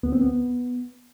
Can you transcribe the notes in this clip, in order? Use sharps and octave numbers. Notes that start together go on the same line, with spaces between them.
D2 B3
C4
D2 B3